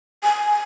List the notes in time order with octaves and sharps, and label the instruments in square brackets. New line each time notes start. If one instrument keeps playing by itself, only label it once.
[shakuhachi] G#5